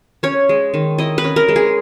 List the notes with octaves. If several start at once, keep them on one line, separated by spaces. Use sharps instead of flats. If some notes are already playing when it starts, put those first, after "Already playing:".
C#4 C#5
G#3
D#3
E4 D#5
B4
C#4
A#4
G#3
G#4